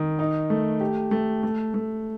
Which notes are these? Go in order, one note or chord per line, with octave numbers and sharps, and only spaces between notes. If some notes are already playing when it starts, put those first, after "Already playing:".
Already playing: D#3
D#4
A3
G4
A3
A3
A3